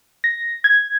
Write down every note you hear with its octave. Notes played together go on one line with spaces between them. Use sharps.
A#6
G#6